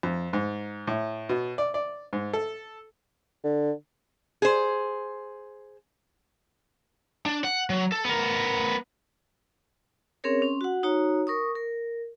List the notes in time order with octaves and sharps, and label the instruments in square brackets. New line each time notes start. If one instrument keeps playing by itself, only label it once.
[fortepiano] F2
G#2
A2
B2
D5
D5
G#2
A4
[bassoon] D3
[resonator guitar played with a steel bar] G#4 C5
[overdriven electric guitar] D4
F#5
F#3
A4
B3 A#4
[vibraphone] C4 C#4 G#4 A#4 C#5
C#4 C6
F#4 F#5
D#4 F#4 C#5 A#5
A#4 C#6 D#6
A#4